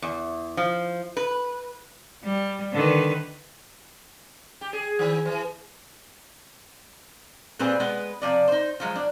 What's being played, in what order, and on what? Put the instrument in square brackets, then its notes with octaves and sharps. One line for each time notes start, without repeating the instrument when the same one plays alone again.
[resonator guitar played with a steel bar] E2
F3
B4
[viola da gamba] G3
D3 D#3 B4
[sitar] G4
G#4
D#3
E3
[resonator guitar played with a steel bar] A#2 G3 C4 G#4 B4
G#3 B3 B4
C3 F3 D5
D#4 C5
F3 F#3 G#3
D4